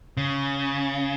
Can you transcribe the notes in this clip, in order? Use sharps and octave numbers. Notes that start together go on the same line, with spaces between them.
C#3